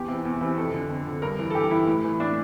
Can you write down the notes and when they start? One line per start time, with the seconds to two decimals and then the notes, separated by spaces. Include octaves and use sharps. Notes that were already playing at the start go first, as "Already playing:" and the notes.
Already playing: E2 G4
0.08 C3 E3
0.25 E2
0.41 C3 E3
0.58 F2 A4
0.74 D3
0.90 F2
1.07 D3
1.22 G2 A#4
1.39 E3
1.50 A4
1.55 G2 G4
1.71 E3 E4
1.87 A2
2.04 E3
2.20 A2 D4